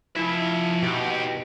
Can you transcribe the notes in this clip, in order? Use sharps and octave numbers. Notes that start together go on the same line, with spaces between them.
F3 E4 E5
B2 D#4 G4